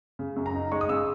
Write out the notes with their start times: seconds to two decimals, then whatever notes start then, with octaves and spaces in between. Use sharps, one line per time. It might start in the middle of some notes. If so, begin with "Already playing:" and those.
0.19 C#3
0.36 F#2
0.46 A#5
0.55 D#4
0.72 G#3 C#6
0.81 D#6
0.89 C#3 E6